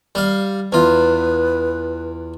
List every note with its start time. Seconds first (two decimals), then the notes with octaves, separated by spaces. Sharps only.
0.15 G3 F5
0.72 E2 F4 B4